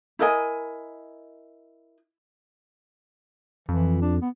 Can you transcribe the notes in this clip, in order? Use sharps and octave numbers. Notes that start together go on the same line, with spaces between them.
E4 A#4 D#5 G#5
F2 E3
D4
B3